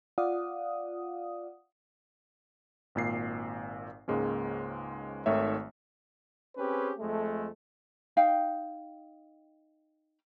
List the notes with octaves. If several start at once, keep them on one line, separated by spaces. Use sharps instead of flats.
F4 D5 F5 F#5 D#6
G#1 A#2 C7
C#2 G#2 G#3 A#3 C#4
G#1 D#3 A3 C#5 E5
C4 C#4 G4 G#4 B4
F2 G#3 A3
D#4 F5 G5